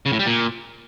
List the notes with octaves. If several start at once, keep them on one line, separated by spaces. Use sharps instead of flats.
C#3
A2
G3
A#2